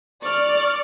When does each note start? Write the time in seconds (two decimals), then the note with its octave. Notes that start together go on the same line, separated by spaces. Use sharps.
0.23 D5 C#6 F6